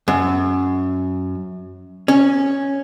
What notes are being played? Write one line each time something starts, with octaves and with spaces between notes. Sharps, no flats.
F#2
C#4